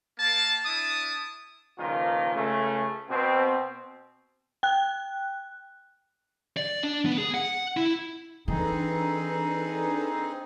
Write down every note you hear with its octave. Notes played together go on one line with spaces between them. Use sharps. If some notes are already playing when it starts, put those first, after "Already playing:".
A#3 A5
D4 E4 A5 D#6
C#2 A#2 D#3 F3 F4
C#2 C#3 A3
B2 C4
G5 F#6
D5
D4
B3
G#4
F#5
E4
E3 C4 D4 D#4 G#4 A4 B4